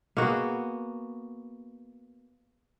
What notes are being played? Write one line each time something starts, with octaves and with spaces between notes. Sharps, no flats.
A#3 B3 F#4 G#4